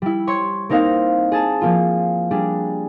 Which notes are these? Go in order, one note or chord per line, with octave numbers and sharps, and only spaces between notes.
G3 E4
C#5 C6 C#6 G#6 C#7
A#3 C4 D#4 A#4 F5
G#4 A5 E7
F3 A#3 F4
G3 D4 G#4